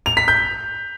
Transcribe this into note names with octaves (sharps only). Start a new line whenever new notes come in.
F7
B6
G6